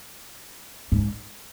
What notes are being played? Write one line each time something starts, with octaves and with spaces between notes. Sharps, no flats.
G#2